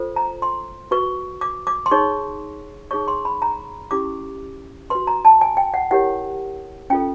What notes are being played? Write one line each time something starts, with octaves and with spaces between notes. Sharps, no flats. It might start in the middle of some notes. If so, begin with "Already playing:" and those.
Already playing: F4 A4 C5
A#5
C6
F#4 B4 C#6
D6
D6
C6
D#4 G#4 C#5 C#6
D#4 G#4 C#5 C#6
C6
B5
A#5
C#4 E4 G4 D6
F#4 B4 C6
A#5
A5
G#5
G5
F#5
E4 G4 A#4 C#5 F#5
C#4 F4 A4 G5